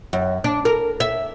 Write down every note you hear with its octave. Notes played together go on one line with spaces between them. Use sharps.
F#2
D4
A#4
E5